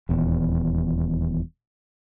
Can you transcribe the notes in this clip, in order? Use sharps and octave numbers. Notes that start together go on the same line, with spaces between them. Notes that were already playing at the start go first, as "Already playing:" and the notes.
D#1 E2